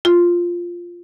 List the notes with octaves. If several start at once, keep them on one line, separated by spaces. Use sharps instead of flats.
F4